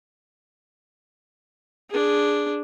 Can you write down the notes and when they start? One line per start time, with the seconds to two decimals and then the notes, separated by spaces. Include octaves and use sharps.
1.90 D4 G#4